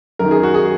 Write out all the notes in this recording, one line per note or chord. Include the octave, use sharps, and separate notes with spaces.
F#2 D#3 A#4
G#4
F#4
G#4